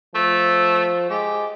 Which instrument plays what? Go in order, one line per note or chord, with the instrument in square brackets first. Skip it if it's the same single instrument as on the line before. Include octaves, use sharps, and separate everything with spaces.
[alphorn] F3 [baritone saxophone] A3
[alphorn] G#3 [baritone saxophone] G4